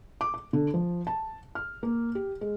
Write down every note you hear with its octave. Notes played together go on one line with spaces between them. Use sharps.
D6
D6
D3
F3
A5
F6
A#3
G4
G#3